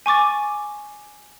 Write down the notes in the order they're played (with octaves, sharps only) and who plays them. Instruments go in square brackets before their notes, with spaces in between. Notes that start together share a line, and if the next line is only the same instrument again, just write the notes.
[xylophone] G#5 C#6 D6 A6